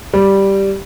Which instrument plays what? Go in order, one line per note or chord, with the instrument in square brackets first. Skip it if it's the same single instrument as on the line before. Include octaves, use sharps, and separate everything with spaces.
[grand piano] G3